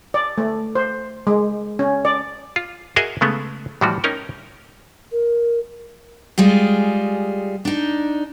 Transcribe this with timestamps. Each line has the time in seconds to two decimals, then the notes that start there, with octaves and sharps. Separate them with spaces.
0.14 D5
0.38 A3
0.75 C5
1.27 G#3
1.79 C#4
2.05 D5
2.56 F4
2.96 F#4 G#4 A#4 D#5 E5 G#5
3.21 C#3 G#3 A3 B3
3.81 A2 E3 F3 G3 F#4
4.04 C#4 D#4 A#4 G5
5.12 A#4
6.38 G3 G#3 F4 G#4
7.65 D4 D#4